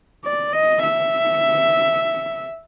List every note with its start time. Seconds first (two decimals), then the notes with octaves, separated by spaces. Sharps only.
0.24 D5
0.52 D#5
0.83 E5